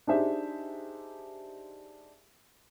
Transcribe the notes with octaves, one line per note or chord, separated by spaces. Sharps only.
D4 D#4 G4 G#4 C5 E5